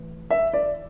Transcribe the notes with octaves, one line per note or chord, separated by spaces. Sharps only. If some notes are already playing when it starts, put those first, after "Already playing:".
Already playing: A2 E3
E5
D5